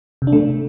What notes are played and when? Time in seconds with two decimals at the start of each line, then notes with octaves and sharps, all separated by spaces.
0.22 C3
0.27 D4
0.32 A3